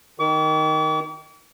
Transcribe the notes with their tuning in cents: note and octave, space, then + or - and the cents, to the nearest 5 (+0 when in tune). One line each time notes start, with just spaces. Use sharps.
D#3 +0 D6 -45